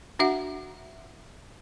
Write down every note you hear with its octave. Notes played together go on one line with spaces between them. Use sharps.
D4 F#4 E5 F#5